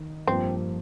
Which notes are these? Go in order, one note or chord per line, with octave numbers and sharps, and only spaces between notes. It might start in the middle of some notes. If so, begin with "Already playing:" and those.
Already playing: D#3
G2 F3 A#3 C4